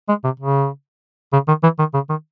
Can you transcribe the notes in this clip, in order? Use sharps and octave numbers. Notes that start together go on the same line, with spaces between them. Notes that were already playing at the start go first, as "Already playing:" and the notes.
G#3
C3
C#3
C#3
D#3
E3
D#3
C#3
D#3